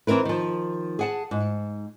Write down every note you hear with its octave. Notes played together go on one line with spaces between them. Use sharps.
E3 C4 E4 A#4 B4
D#3 F3
G#4 F#5 A5
G#2